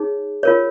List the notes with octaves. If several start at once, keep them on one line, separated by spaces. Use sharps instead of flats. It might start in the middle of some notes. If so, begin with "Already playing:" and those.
Already playing: D#4 G#4 C#5
F4 A#4 C#5